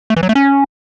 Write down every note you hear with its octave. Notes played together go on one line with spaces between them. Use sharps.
A3
E3
F#3
A3
C#4